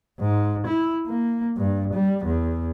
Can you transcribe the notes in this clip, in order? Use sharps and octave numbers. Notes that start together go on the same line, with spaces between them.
G#2
E4
A#3
G2
G3
E2